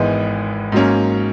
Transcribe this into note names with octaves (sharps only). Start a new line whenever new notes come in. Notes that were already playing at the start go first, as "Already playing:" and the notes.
Already playing: G#1 G#2 E3 G#3 B3
G#2 F#3 A#3 C#4